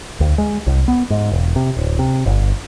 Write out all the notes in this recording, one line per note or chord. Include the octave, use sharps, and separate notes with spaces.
D2
G#3
C2
B3
G#2
E1
C3
D1
C3
G1